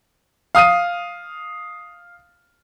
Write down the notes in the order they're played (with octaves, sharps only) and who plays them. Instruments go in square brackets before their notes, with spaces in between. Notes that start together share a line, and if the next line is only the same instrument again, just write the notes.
[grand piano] F5 D#6 F6 D#7